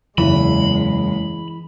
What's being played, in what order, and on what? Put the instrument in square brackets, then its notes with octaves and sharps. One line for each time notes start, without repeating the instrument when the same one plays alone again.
[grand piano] F#1 E2 [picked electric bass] E3 [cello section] G#3 [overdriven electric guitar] B5